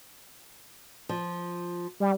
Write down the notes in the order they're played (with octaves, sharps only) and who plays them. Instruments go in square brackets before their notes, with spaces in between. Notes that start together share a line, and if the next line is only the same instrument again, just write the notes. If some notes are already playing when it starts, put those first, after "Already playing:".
[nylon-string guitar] F3
[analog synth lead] G3